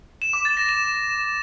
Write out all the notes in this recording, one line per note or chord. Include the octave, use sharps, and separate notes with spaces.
E7
D6
A6
A#6
E7